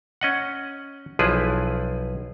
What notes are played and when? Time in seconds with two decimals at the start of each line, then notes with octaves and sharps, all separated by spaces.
0.21 C#4 D#5 F#5
1.19 B1 F3 E4 G#4 B4